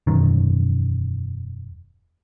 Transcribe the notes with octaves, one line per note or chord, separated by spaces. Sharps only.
E1 F#2 D#3